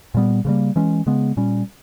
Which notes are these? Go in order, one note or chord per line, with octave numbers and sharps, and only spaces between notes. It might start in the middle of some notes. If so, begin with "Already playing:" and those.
A#2 G3 B3
C#3 E3 G3 A#3
E3 G#3 C#4
C#3 G#3 B3
A#2 G3 C#4